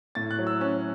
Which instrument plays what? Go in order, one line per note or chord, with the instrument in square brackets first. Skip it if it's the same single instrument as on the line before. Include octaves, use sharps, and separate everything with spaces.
[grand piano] A2 A6
F#6
F#3
E6
C#4 F#6